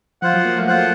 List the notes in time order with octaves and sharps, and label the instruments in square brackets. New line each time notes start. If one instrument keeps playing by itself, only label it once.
[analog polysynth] F3 [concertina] F4 C5 F#5
[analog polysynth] F#3
A#3
A3
[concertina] F4 C5 F#5